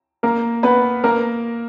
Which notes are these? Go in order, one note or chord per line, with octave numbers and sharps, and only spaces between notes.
A#3 A#4
B3 B4
A#3 A#4